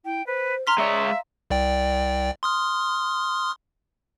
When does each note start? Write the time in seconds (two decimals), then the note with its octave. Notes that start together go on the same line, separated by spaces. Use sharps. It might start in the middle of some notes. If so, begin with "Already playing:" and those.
0.05 E4 G5
0.27 B4 C5
0.67 A#5 C6 F6 B6
0.78 G#3 C#5 D5 E5
1.04 F5
1.50 C2 D5 G5
2.43 C6 D#6 F6